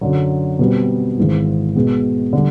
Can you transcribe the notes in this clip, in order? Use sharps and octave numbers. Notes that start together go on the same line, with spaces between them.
F#2 D3 F#3
B2 G3 C4
G#1 G#2 E3
B2 G#3 B3
D3 G3